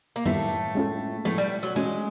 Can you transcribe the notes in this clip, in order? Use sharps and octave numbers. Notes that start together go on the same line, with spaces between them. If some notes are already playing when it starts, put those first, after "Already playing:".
A#3
F#2 A2 D#3 G3 A3 B3 E4
G#3 C#4 F4 A4
A2 F3 G#3 A3 B3
G3
F#3
E3 G#3 A3 C#4 F#4